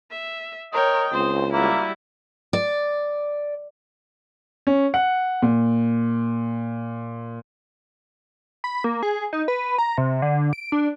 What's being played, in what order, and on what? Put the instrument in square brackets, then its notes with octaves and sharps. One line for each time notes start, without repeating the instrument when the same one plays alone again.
[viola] E5
[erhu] A#4 [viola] C#5 G5 [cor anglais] D#5
[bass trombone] C#2 [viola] C4 [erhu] C5
[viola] G3 F#4 [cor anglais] A#3 [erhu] E4
[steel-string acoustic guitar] D5
[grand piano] C#4
F#5
A#2
[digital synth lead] B5
A#3
G#4
D#4
B4
A#5
C3
D3
D7
D4